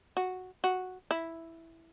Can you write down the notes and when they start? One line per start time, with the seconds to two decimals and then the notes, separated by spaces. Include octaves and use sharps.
0.17 F#4
0.64 F#4
1.11 E4